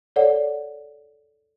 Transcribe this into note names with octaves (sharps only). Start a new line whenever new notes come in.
A4 C#5 D5 F#5